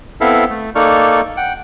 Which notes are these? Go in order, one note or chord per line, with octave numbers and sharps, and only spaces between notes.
B3 C4 E4 A4 E5 F5
A3
A#3 D#4 A4 D5 C#6 F6
F#5 G5